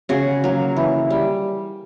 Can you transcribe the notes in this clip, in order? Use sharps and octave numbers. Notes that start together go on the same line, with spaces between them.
C#3 F#4 G#4
F#3 A#3
E3
G3